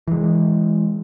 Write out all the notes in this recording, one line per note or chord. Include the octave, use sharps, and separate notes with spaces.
E3 G#3